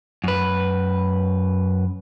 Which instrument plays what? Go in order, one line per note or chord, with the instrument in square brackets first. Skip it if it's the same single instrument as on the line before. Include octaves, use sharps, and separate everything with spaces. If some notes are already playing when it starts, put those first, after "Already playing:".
[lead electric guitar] F#2 B4